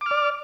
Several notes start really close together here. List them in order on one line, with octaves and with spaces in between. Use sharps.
D6 F6 D5